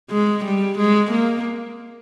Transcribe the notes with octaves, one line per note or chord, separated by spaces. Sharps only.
G#3
G3
G#3
A#3